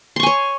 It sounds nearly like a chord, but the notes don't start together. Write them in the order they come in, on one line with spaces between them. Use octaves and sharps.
C6 C#6 G#5 C#5